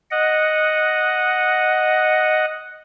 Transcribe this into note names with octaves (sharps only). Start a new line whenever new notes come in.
D#5 F#5